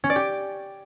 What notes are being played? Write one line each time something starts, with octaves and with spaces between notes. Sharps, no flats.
C#4
D5
G4